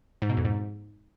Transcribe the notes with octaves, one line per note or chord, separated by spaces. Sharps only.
G#2
B2
F2
G#2